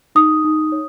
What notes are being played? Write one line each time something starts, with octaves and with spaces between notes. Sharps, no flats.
D#4 D#6
D#4
C#5